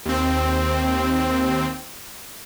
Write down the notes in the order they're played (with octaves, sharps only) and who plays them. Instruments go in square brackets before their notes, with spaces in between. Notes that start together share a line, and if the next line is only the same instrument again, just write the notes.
[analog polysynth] D#2 C4